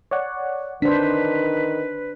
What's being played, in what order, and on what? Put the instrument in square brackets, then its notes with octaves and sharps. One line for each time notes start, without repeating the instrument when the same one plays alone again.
[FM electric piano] C#5 D5 F#5
[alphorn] D#3 [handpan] D4 C5 [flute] B4 [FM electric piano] B6